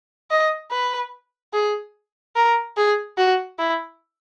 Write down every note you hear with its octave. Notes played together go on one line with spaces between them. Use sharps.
D#5
B4
G#4
A#4
G#4
F#4
E4